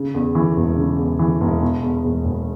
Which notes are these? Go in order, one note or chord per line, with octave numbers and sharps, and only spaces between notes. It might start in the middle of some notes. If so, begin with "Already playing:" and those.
Already playing: C#3
E2
E3
E1
C#3
E2
E3
E1
B2
E2
E1
E1